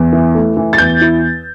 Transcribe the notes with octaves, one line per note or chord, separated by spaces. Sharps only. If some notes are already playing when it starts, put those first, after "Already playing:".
Already playing: E2
E3
A3
E3
A6
E2 G6
E4